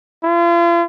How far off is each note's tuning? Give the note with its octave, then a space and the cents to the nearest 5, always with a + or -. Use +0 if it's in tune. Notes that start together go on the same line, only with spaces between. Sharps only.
F4 -40